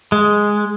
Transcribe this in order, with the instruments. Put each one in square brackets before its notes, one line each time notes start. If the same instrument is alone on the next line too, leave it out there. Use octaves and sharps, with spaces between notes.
[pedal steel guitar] G#3